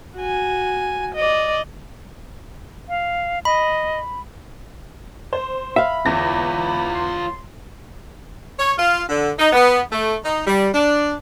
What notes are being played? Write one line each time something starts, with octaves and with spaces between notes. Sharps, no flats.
F#4 G#5
D5 D#5
F5
D#5 B5
C5
E5 F5 B5
E2 F4 C#5 A#6
C6
C#5
F4
D3
D#4
B3
A3
D#4
G3
D4